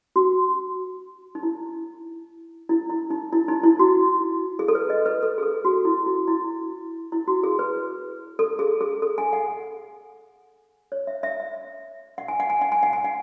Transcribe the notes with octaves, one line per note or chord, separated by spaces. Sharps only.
F#4
D#4
E4
E4
E4
D#4
E4
D#4
E4
F#4
G#4
A4
B4
D#5
B4
A4
G#4
A4
F#4
E4
F#4
E4
E4
F#4
G#4
B4
A4
G#4
G#4
A4
G#5
F#5
C#5
E5
E5
E5
F#5
G#5
F#5
G#5
F#5
G#5
F#5
G#5
F#5